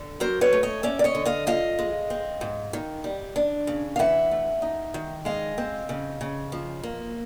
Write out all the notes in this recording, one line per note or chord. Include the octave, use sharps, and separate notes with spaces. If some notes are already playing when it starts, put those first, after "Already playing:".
Already playing: D3
F#3 A#4 C5
B4 C#5
A3
C#5 D#5
C#4 D5 E5
D5
C#5 D#5
D3
D#5 F5
F3 D#5 F5
G#3
C4
G#2
D#3
G3
D4
C#3
F5
E3 E5 F#5
A3
D#4
D#3
G#3 D#5 F5
C4
C#3
C#3
F3
A#3